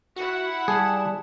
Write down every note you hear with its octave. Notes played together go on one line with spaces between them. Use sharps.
E4 F#4 F#5
G3 G#4 A5